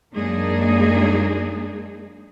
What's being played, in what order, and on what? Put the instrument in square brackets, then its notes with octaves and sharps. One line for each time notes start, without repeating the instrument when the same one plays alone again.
[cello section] F#2 G#3 A#3 D4 D#4 G#4